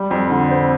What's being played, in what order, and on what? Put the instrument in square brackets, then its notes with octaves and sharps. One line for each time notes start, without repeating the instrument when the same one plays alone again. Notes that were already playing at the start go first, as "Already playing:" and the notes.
Already playing: [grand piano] G3
F2
D3
C4